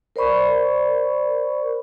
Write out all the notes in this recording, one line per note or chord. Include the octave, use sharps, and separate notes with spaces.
A#4 C5 D5 B5 C#6